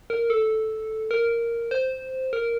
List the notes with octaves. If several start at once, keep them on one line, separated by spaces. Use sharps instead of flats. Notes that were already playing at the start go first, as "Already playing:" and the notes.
A#4
A4
A#4
C5
A#4